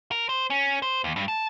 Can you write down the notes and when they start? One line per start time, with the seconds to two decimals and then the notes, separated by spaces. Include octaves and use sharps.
0.12 A#4
0.29 C5
0.50 C#4
0.82 C5
1.04 D#2
1.16 G2
1.28 A5